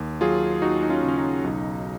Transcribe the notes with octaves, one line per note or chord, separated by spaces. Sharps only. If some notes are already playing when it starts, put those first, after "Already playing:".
Already playing: D#2
F#3 F4 G#4
D#2 D#4 F#4
D#4
C#4 F4
C#3 C#4
D#4
B1